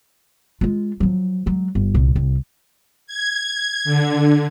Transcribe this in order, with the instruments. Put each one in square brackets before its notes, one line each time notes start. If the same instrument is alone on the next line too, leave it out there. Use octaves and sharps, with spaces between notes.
[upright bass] G#3 F4
F3 F#3
F#3 G#3
G1
C2 A#2
C2
[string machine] G#6
D3